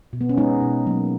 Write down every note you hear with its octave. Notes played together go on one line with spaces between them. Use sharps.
B2
B3
C#4
G#3 B3 D#4
B2
F#3 A#3